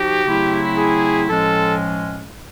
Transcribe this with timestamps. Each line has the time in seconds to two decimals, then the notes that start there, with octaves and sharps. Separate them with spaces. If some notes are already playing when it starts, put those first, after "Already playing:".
Already playing: F3 D#4 F#4 G4
0.25 C#3 F#3 A3 C4 E4
0.77 G#4
1.28 A2 F3 G#3 C#4 A4